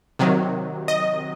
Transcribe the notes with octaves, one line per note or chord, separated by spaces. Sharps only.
C3 D#3 F#3
D#5